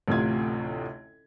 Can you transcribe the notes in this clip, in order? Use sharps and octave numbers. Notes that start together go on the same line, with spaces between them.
A1 D2 A2 C3 F4 G#6